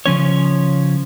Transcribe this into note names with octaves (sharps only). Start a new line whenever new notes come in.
C#3 F3 C#4 C#5